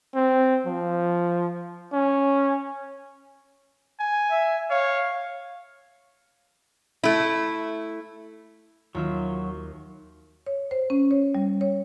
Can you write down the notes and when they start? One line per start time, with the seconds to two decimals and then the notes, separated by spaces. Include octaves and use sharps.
0.15 C4
0.66 F3
1.93 C#4
4.00 G#5
4.31 E5
4.70 C#5 F5
7.03 A3 E4
8.95 D#2 F#3 F4 E5
10.46 C#5
10.71 C5
10.90 C#4
11.11 C#5
11.35 G3
11.61 C#5